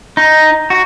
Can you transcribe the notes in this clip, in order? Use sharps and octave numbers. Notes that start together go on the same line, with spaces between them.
D#4
F#4